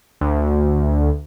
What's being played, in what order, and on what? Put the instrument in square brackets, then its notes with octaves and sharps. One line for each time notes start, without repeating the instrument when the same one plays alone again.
[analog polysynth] D2